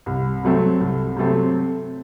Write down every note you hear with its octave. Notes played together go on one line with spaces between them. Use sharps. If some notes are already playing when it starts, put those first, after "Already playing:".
C2
C3 F#3 A3 C4
C2
C3 F#3 A3 C4